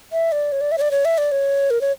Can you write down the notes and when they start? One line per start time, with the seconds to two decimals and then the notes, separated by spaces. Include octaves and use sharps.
0.12 E5
0.32 D5
0.52 C#5
0.61 D5
0.72 E5
0.78 C#5
0.81 D5
0.91 C#5
1.05 E5
1.18 D5
1.32 C#5
1.70 A#4
1.81 C#5